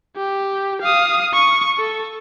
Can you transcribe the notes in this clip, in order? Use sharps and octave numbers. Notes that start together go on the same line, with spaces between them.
G4
F5 D#6
C#6
A4